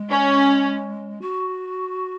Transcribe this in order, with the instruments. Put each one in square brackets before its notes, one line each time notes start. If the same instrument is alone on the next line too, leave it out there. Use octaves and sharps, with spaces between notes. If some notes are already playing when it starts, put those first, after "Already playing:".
Already playing: [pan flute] G#3
[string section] C#4
[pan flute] F#4